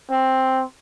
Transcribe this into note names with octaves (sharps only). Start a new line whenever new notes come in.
C4